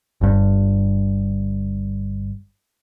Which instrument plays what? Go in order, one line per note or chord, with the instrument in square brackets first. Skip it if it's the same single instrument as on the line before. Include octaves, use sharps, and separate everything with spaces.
[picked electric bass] G1 G2